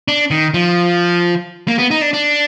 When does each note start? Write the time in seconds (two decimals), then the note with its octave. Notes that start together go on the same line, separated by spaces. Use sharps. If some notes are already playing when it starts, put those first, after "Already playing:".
0.08 D4
0.31 D#3
0.54 F3
1.68 A#3
1.78 B3
1.91 D#4
2.01 D4
2.13 D4